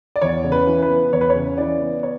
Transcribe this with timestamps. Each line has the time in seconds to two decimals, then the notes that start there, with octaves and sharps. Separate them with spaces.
0.16 D5
0.22 E2 C#5
0.44 C#3
0.52 B4
0.67 E3
0.82 B4
0.90 B3
1.13 E2 C#5
1.21 B4
1.30 C#5
1.35 C#3
1.58 E3 D5
1.80 B3
2.03 C#5